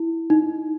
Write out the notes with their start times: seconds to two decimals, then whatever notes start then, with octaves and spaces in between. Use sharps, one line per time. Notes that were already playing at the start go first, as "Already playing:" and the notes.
Already playing: E4
0.30 D#4